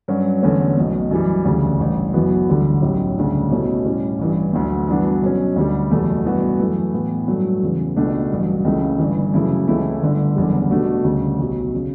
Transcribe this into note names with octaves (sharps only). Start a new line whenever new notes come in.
G2 F#3 C#4 F#4
E1 E2 D3 A3 C#4
B1 B2 A3
F#2 E3 G3
E1 D2 C#3
A1 G2 E3
F#1 F#2 E3 B3 F#4
E1 D2 D3 G3
B1 A2 F#3 C#4
D2 C#3 G3 D4
B2 A3 C#4 E4
A2 G3 C#4
A1 G2 E3
D2 D3 F#3 A3
G2 E3 B3 D4 F#4
B2 F#3 C#4
D2 D3 G3
F#1 E2 B2 A3
G2 E3 B3 F#4
F#2 E3 A3
A2 E3 B3
G2 F#3 A3
E2 C#3 E3
C#2 B2 A3 D4 F#4
A1 G2 F#3
C#2 C#3 E3 A3
G1 G2 E3
F#2 C#3 E3 A3 E4
C#2 C#3 E3 A3 E4
G1 G2 D3
F#1 E2 D3 G3
B2 A3 D4 F#4
D2 C#3 G3
B1 B2 F#3
C#3